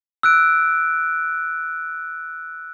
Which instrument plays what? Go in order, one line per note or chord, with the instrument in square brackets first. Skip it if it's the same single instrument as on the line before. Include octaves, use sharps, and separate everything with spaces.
[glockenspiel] E6 F#6 D7